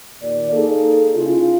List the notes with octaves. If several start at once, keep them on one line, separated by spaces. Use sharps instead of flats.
D#2 A#2 D5
A#3 D#4 G#4 A4
C#3 E4 F4